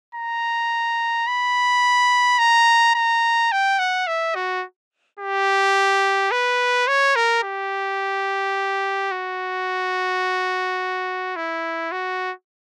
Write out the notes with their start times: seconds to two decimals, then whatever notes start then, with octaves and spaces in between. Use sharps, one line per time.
0.15 A#5
1.27 B5
2.39 A#5
2.95 A#5
3.52 G5
3.79 F#5
4.07 E5
4.35 F#4
5.19 G4
6.31 B4
6.88 C#5
7.16 A#4
7.44 G4
9.12 F#4
11.36 E4
11.92 F#4